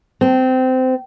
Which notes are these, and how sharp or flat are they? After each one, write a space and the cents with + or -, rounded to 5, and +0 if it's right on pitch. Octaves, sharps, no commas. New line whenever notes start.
C4 -20